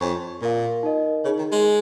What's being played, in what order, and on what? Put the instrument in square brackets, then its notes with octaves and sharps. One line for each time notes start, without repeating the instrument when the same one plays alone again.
[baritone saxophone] F2 [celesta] F4 C#5 G#5 C#6
[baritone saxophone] A#2 [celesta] F4 A#4 F5
[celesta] D#4 A#4 D#5
[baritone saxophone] C#3 [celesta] D#4 G#4 C#5
[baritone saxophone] D#3
G#3